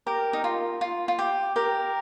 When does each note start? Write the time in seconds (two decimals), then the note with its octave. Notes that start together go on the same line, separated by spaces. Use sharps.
0.06 G4 A#4
0.33 D#4
0.44 F4
0.81 F4
1.08 F4
1.19 G4
1.56 G4 A#4